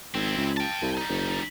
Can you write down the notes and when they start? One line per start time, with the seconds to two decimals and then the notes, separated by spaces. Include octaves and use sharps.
0.14 G#1 C4 E4
0.37 C#2
0.57 G5 A5
0.82 C2
0.97 G3 D#4
1.09 F#1